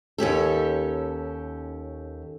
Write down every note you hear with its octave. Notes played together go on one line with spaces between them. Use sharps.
D#2 C#4 G4 A4